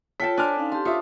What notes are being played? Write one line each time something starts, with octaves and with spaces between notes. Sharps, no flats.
F4 A4 C#5 G5 A5 B6
D4 C5 C#5 G#5 D6 F6
C#4 D#4 F5
G4 A5 C6
F4 C#5 E5 D#6